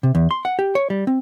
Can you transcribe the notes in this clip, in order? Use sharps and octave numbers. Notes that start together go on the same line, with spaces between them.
C3
E2
C6
F#5
G4
C#5
G3
C4